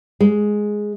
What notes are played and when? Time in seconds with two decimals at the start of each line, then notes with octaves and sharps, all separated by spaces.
0.20 G#3